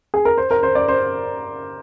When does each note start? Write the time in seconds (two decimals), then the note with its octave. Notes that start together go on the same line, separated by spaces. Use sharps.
0.14 G#4
0.25 A#4
0.37 C5
0.51 A#4
0.63 C5
0.75 D5
0.88 C5